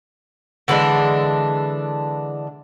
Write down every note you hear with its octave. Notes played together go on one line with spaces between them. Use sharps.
D3 E3 G#3 D4